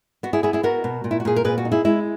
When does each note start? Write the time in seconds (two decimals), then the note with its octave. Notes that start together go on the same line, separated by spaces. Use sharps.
0.23 B3 F#4
0.33 E4 G#4
0.43 B3 E4 G#4
0.53 E4 G#4
0.63 B3 F#4 A#4
0.84 B2
1.04 A#2
1.11 E4
1.20 F#4
1.25 A#2 G#4
1.36 A#4
1.44 A#2 G#4 B4
1.58 F#4
1.65 D#4
1.72 E4 G#4
1.85 G#3 E4